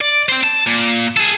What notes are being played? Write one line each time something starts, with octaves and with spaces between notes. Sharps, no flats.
D5
C4 C5
A5
A#2
G#4 A4